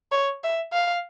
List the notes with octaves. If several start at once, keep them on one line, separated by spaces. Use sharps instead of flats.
C#5
E5
F5